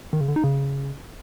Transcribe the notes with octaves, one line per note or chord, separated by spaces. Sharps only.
D#3
C#3
D3
D#4
C#3